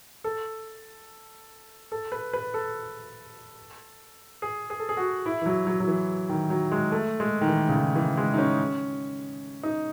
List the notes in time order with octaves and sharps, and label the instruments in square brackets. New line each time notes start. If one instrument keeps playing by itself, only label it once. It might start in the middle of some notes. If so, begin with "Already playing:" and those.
[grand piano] A4
A4
B4
B4
A4
G#4
G#4
A4
G#4
F#4
E4
E3
F#3
F#3
F#3
E3
D#3
F#3
G#3
A3
G#3
D#3
E3
C#3
D#3
E3
G#3
D#4
C#4
D#4